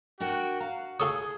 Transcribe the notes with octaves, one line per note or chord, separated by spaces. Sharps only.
D4 F#4 A#4 G5
F#4 F5 A#5
F4 G#4 A4 C#5 D#6